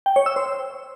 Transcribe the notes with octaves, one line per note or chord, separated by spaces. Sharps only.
G5
C#5
E6
C5